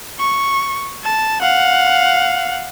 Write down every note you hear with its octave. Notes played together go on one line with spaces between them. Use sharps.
C#6
A5
F5 F#5